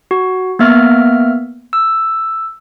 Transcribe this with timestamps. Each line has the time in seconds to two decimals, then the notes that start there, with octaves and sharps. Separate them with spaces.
0.11 F#4
0.59 A#3 B3 E5 F6
1.73 E6